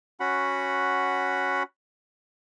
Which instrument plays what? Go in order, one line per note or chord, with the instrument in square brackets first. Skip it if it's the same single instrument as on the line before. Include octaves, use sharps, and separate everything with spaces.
[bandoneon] C#4 F#4 F#5 B5